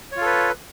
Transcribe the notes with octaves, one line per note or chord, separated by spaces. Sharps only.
F4 A4 B4 C#5